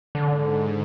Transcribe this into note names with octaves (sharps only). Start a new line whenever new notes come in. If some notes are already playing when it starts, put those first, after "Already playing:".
G#2 D3